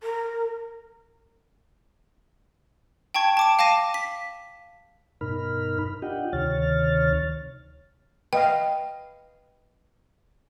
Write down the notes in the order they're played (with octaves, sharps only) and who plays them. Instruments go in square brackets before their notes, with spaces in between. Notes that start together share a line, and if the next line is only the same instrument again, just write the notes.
[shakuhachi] A#4
[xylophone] G5 A5 C#6 G#6
A5 D6 D7
F5 A5 D6 A#6 D#7
B6
[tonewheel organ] G2 B2 D#4 A#4 B5 F6
D4 F4 G4 D#5 F#5 G5
D2 C3 D#3 C#5 F6 A6
[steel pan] B4 D#5 F5 [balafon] G5